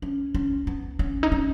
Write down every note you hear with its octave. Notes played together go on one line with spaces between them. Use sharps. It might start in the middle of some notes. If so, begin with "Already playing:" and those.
C#4
C#4
B3
C#4
D#4
C#4